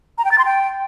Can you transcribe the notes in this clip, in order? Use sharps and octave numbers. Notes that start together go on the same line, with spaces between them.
A#5
G5
A6
C6
G5